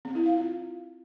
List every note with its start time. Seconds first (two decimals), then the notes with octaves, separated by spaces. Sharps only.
0.05 C4
0.15 E4
0.26 F5
0.36 F4